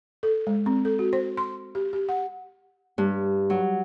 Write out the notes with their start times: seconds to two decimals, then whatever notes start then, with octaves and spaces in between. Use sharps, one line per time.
0.23 A4
0.47 G#3
0.66 C4
0.85 A4
0.99 F#4
1.13 C5
1.37 C6
1.75 G4
1.93 G4
2.09 F#5
2.98 G2
3.50 F#3